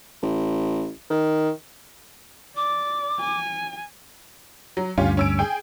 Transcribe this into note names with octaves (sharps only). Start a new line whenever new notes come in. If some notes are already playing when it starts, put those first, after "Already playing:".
A1
D#3
D5 D6
G#5
F#3
D2 G2 C#4 F4 G4
C#4 E6 D7
G#4 G5